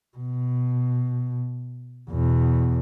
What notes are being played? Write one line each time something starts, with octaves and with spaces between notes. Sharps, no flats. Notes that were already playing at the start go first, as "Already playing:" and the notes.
B2
E2 B2